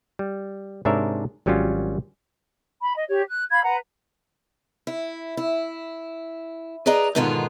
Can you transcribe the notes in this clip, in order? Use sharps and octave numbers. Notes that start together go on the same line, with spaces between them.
G3
G#2 C3 D4 A#4 C#5 E5
G#1 F#3 G3 C#4 F4
B5
D#5
G4 C#5
F#6
F5 B5 G#6
B4 F#5 A#5
E4
E4
G#4 B4 D5 D#5 A#5
G#2 B2 D3 D#3 B3 F4